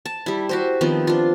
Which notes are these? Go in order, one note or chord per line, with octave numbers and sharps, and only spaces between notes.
A5
G3 E4
F#4 G4 C5
D#3 F3 B3 C4
D4 F4